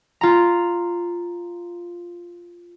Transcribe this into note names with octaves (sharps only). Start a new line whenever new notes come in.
F4 A#5